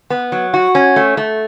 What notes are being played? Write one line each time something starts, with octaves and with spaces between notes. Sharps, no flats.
B3
F#3
F#4
C#4
A3
A3